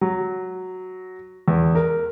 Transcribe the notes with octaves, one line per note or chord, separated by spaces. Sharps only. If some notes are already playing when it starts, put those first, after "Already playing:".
F#3
E2
A#4